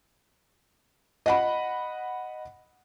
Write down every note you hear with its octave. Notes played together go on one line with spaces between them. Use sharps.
D#5 F#5 B5